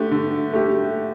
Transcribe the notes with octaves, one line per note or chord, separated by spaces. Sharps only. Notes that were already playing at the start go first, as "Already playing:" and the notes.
Already playing: D3 A3 G4
D3
A3 G4